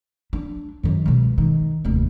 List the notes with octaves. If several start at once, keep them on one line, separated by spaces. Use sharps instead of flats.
D4
F#2 D#3
C#2 B2
D#3
F1 D#2